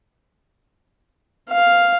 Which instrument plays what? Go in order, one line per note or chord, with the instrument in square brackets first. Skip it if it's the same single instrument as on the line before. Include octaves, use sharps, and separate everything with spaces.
[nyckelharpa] F5